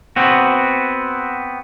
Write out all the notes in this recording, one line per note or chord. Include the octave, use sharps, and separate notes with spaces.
B3 C4 F#4